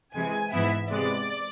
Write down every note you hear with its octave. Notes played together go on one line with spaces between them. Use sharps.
C3 E3 G#3 G#5
G#2 E3 B3 E4 E5
C3 G#3 B3 D5